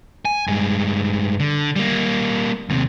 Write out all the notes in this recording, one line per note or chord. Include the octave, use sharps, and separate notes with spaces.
G#5
G2 G#3
D3
G3 A#3
D#2 C3